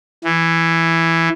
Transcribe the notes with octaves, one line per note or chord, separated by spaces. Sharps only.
E3